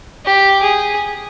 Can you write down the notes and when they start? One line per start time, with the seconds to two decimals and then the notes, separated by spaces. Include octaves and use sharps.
0.25 G4
0.62 G#4